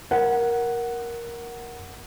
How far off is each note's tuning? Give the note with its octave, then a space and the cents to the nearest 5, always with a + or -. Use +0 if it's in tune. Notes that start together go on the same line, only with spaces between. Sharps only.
A#4 +10 F#5 +0